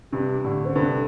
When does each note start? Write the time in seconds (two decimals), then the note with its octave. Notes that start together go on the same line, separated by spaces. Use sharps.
0.12 G2 C3 G4
0.44 A2 D3
0.65 D3 C5
0.75 G2 C3 A4